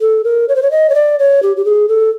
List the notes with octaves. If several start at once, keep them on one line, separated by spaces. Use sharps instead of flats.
A4
A#4
C#5
C5
C#5
D#5
C#5
D5
C#5
G4
G4
G#4
A4